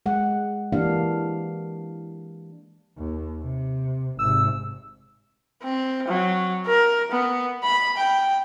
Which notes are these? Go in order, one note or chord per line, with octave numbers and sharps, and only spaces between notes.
G#3 F#5
E3 A#3 D4 G4 F5
D#2
C3
G#1 C3 E6
C4
F#3
A#4
B3
B5
G5